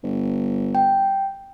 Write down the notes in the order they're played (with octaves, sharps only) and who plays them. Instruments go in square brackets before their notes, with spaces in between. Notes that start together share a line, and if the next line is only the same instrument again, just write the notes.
[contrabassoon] G1
[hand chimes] G5